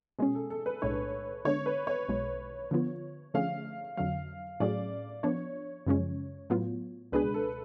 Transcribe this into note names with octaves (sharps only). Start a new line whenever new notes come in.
B2 G#3 C#4 G#4
A4
A4
B4
B1 A2 G#3 D4 C#5
D3 G#3 B3 D4 C#5
B4
C#5
B1 B2 G#3
D3 F3 B3 F4
D3 F3 A3 C#4 G#4 F5
F2 D3 F#3 F5
A2 F#3 C#4 G#4 D5
F3 B3 D4 C#5
F#2 C#3 F3 G#3 C#4
A2 F#3 B3 F4
C#2 B2 G#3 D4 G#4 B4
A4